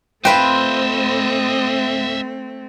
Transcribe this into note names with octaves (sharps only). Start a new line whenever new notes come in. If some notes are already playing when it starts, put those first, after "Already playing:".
A3 C4 F4 B4 C5 D#5 E5 G5